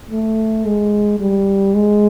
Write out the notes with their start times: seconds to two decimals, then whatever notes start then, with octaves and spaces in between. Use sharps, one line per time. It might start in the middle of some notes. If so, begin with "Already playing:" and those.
0.11 A3
0.65 G#3
1.20 G3
1.75 G#3